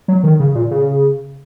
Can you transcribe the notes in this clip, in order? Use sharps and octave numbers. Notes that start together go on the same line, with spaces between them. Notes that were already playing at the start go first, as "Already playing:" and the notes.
F#3
D#3
C#3
A#2
C#3